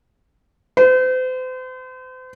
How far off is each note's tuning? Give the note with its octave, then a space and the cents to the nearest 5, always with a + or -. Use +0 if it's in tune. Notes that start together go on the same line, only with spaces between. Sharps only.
C5 -40